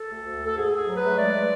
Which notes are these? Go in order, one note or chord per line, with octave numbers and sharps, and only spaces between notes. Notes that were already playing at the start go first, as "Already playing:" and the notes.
Already playing: A4
D2
D2
D2
A4
G#2 G#4
G#2
G#4
F#3
B4
A3
G#3 D5
G#3